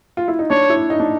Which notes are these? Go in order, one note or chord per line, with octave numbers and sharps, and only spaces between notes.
F4
E4
D#4
D4 C#5
E4
D#4
D4